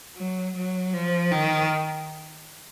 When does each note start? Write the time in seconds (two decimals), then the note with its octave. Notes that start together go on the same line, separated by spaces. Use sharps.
0.17 F#3
0.56 F#3
0.94 F3
1.32 D#3